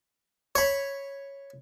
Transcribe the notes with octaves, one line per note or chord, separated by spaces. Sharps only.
C#5 B5